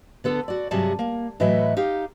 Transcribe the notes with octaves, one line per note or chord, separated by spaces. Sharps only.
D3 B3 A4
F#4 D5
G2 C3 F#3 G3 G#4 A5
A#3
A2 E3 F#3 B4 D#5 E5
D#4 G4 F5